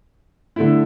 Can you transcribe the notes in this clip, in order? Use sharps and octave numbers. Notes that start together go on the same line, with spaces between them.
D3 A3 E4